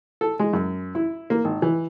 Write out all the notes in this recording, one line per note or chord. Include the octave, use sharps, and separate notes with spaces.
A4
G#3
F#2
E4
A#3
G#1
E3